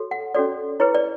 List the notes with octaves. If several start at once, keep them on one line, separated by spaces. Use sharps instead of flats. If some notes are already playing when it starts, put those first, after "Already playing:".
Already playing: F#4 A4 C#5
F#5
C#4 F#4 A4 C#5 D5
E4 G#4 B4 C#5
D5